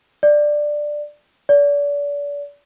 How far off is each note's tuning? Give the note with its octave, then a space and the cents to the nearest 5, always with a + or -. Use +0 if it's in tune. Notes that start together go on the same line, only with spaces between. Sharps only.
D5 +10
D5 -35